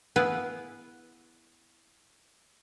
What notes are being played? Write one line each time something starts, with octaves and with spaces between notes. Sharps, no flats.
B3 E4 G#4 B4 F5